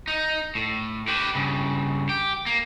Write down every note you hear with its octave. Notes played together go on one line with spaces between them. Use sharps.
D#4
A2
G4 B4
G2 C#3
G4
A#3